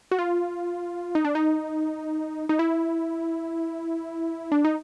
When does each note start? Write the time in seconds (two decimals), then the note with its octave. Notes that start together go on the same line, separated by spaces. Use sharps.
0.11 F#4
0.19 F4
1.15 D#4
1.25 D4
1.35 D#4
2.49 D#4
2.59 E4
4.52 D4
4.65 D#4